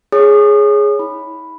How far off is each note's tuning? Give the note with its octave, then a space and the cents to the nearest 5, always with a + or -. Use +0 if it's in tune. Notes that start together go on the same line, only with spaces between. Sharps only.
G#4 +0 C#5 +0 D#6 -40
E4 -45 B5 +0